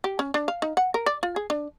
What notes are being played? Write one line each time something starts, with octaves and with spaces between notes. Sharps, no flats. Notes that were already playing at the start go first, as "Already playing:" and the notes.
G4
C#4
D4
F5
D#4
F#5
A#4
D5
F4
G#4
D4